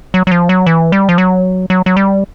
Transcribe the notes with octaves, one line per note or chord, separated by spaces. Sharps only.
F#3
F#3
F3
F#3
E3
G3
F3
F#3
F#3
F#3
G3